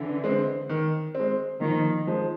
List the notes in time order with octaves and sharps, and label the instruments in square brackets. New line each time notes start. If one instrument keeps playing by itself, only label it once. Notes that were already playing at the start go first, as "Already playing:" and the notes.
Already playing: [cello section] D3 E3
[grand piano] G#3 C4
D#3
G#3 C4
[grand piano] A#2 [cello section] D#3 F3
[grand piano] F3 G#3